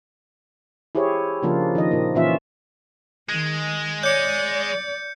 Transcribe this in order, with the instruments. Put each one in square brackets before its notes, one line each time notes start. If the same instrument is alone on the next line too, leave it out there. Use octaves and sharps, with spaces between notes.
[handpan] E4 G4 G#4 C5 C#5
C#3 F3 A#3 D4 F4
D#3 F3 D#5
A#2 A#3
A#2 E3 A#3 C#4 F4 E5
[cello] D#3 [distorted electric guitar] G#3
[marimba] C#5 D6 [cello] D5 [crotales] G6 C#7